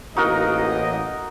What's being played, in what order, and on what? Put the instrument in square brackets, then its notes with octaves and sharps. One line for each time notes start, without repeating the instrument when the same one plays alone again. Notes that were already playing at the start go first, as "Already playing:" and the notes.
[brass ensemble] A1 A#3 D#5 [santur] D#4 F#4 A#4